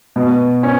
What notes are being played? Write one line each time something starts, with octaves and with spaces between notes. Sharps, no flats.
B2
C#4